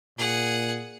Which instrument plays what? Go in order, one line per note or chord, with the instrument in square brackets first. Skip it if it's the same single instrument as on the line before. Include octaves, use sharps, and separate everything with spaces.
[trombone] A#2 [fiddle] G#4 F#5